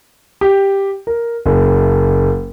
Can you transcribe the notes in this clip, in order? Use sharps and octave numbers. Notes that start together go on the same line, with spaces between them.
G4
A#4
F#1